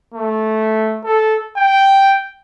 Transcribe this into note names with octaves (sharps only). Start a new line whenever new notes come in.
A3
A4
G5